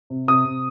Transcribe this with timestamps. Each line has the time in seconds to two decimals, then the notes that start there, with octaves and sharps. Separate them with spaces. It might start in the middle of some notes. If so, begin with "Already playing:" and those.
0.10 C3
0.28 C3 D#6
0.45 C3